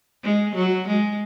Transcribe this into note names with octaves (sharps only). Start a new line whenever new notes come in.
G#3
F#3
G#3